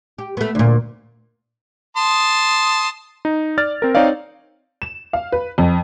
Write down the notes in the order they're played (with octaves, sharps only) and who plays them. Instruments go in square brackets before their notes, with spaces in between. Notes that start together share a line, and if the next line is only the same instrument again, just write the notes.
[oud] G4
A3 B3
D2 A#2
[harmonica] A5 C6 D#6
[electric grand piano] D#4
D5 F6 A6
C4 A#4
C4 D#4 C#5 D5 F5
[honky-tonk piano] E7
F5
B4
F2